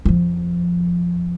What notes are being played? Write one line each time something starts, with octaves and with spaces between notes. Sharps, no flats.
F2 F3